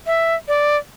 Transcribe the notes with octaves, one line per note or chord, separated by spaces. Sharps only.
E5
D5